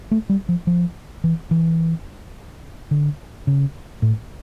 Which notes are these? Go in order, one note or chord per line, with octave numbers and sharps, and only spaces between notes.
A3
G3
F3
F3
E3
E3
D3
C#3
A2